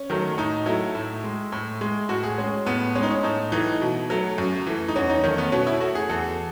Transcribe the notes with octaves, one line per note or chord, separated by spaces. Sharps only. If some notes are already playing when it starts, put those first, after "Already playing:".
Already playing: C#4
D#3 F#3 A3
A2 D#4
F#3 A3 E4
A2
G#3
A2
G#3
A2 F#4
G#4
G#3 C#4
A2 B3
G#3 C#4
D#4
C#4
A2 D#4
E3 A3 D#4
B2
F#3 A3
F#2
E3 A3
D#4
E2 C#4
D#4
D#3 A3 C#4
B3
B2 C#4
E4
A3 F#4
G#4
E2 A4